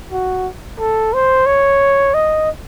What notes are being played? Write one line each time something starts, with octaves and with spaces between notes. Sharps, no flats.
F#4
A4
C5
C#5
D#5